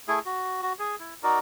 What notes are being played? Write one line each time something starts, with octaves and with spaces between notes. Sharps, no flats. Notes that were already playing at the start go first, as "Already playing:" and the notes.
A3 E4 G#4
F#4
F#4
G#4
E4
D#4 F#4 A#4 D5